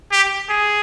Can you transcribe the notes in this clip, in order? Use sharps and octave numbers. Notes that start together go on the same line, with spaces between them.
G4
G#4